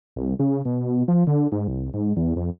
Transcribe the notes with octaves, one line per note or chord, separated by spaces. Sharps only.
C2
C#3
B2
F3
D3
G#2
C2
G#2
E2
F2